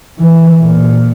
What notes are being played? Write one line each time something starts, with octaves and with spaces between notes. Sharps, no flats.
E3
A#2